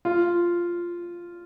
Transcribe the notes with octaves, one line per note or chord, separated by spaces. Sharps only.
F4